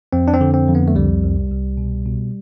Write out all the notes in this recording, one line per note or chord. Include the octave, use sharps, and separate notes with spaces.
F2 C4
D4
C4
D3
C4
F2
B3
A3
C2 G3
C2
C2
B2
B2